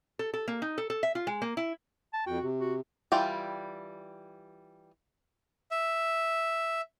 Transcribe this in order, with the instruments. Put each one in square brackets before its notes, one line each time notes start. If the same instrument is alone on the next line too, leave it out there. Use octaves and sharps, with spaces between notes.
[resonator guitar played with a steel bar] A4
A4
A#3
D#4
A4
A4
E5
F4
G#3
A#3
E4
[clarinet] A5
[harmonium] F2 G5 [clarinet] F#4
[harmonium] C3
[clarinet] F#4
[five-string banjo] E3 G3 F4 G5
[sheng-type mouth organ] E5